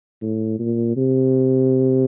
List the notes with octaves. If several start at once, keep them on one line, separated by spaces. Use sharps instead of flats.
A2
A#2
C3